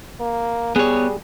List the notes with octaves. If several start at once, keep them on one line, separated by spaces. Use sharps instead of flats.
A#3
G3 B3 G#4 C#5